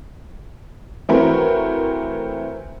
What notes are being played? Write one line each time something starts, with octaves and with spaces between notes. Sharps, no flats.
E3 A3 C4 F#4 A#4 B4